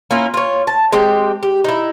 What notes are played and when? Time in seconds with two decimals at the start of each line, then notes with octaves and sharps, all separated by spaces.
0.11 A#3 C#4 E4 F4
0.34 F4 C#5
0.67 A5
0.92 G#3 C4 G4
1.43 G4
1.64 D#4 E4